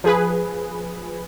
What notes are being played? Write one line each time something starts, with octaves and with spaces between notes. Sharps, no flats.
F3 G#4 B4